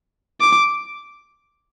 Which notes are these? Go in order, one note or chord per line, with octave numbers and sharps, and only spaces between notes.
D6